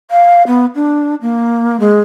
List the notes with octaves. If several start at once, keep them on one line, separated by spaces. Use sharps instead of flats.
F5
B3
D4
A#3
G#3